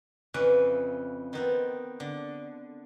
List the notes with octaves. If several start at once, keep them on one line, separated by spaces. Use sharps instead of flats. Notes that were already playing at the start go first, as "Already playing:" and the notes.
F2 C#3 E3 B4
D#3 B3 C4
D3